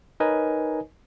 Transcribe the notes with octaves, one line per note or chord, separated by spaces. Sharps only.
D#4 A#4 B4 C#5 D#5 G#5